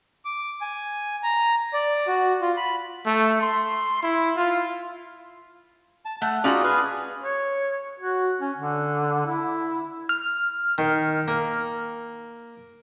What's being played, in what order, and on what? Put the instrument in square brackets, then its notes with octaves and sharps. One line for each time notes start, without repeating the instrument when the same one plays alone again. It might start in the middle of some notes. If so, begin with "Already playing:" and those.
[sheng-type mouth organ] D6
G#5
A#5
D5
F#4
F4
B5
[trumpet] A3
C6
E4
F4
[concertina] A5
[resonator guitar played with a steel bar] A3 [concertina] F#5
[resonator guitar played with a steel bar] C#4 D#4 F#4 [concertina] F4 G#4 D5
[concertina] G#4 B4 F5 [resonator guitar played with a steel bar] G#5
[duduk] C#5
F#4
C#4
D3
E4
[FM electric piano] F6
[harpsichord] D#3
A#3